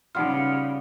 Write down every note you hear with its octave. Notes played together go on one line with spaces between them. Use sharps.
C#3 G3 B3 D#4 F4 F#5 F6